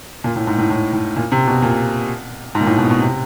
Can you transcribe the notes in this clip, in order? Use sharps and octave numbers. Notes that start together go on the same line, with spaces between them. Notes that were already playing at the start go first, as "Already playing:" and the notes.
A#2
A2
G#2
A2
A2
A2
A#2
C3
B2
A#2
G#2
A#2
A2
B2
B2
C3